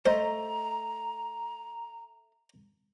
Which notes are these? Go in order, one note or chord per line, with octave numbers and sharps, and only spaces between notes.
A3 C5 D#5 A#5